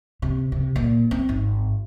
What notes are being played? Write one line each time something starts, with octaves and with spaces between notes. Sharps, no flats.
C3
C3
A#2
C4
G#1